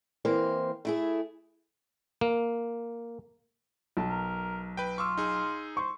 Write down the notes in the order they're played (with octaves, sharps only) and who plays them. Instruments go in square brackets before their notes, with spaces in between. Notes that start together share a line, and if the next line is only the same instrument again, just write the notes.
[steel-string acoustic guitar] E3 A#3 C4 C5
A3 E4 G#4
[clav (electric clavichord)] A#3
[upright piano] B1 A5
[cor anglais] A#4
[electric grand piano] B4 G5
[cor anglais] F4 [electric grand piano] C#6 D6 E6
[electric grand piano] D#4 G#4
[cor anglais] C5 [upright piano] C#6